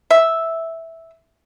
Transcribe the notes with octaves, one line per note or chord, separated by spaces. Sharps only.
E5